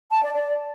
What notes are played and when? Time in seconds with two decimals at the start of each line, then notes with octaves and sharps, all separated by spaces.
0.11 A5
0.22 D5
0.33 D5